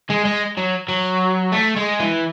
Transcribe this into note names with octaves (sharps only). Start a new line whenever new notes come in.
G#3
G#3
F#3
F#3
A3
G#3
E3